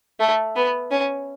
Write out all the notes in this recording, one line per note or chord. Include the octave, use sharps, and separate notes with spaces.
A3
B3
C#4